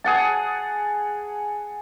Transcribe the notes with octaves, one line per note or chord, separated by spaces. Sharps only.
G#4 F#5 A5